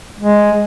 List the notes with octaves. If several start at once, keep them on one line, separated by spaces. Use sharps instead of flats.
G#3